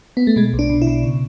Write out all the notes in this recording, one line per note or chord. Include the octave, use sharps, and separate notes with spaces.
B3
A3
B2 G#3
B1
D4
B2
E4
B2
C#3